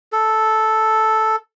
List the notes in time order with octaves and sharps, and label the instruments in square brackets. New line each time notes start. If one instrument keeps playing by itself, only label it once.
[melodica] A4